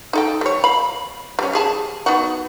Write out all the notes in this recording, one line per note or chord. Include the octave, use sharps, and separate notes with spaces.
D#4 A4 G5
G3 C#5
F5 B5
G3 C#4
G4 G#4 A5
B3 D#4 F#4